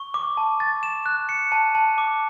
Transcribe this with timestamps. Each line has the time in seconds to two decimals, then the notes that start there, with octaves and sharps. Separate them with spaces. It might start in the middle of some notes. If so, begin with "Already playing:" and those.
Already playing: C#6
0.14 D6
0.37 A5
0.60 A6
0.83 E7
1.06 F#6
1.29 C#7
1.52 A5
1.75 A5
1.98 D6